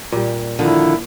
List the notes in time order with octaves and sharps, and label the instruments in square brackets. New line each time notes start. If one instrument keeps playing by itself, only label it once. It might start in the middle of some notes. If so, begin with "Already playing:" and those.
[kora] A#2 G3
[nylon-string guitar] D3 D#3 F3 [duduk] E4